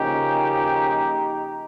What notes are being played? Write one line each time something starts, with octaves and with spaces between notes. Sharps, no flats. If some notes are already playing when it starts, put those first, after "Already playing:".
Already playing: C#3 F3 A#3 C#4 D#4 G4